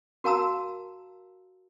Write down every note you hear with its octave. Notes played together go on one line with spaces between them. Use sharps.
F#4 A#4 F5 A5 A#5 E6